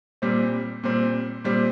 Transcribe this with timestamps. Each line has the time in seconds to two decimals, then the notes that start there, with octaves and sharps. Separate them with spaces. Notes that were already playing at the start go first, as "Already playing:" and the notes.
0.22 A#2 G3 C4
0.83 A#2 G3 C4
1.44 A#2 G3 C4